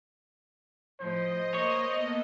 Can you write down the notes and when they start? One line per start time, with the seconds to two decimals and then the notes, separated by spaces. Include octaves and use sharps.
1.00 A2 F3 C5 D#5
1.54 A#3 C#5
1.89 A#3 B3 A4 D#5